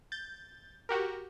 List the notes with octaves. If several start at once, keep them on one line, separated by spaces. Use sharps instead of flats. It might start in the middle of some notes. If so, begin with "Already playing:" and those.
G6 A6
F#4 G4 A#4